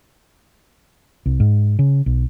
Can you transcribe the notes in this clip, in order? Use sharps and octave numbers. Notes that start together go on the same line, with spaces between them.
C2
G#2
C#3
B1